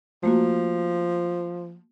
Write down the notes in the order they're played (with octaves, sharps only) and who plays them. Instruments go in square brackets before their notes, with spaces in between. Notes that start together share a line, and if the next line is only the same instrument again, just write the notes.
[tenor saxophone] F3 [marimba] A3 A#3 F#4